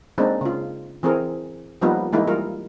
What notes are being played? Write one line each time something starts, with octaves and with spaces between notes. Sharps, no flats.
G#3 A#3 C4 D4 D#4
C#3 F4
E3 C4 G#4 A#4
F3 G3 A#3 B3 D#4 F4
E3 G#3 A#3 D#4 E4
G3 F4 A#4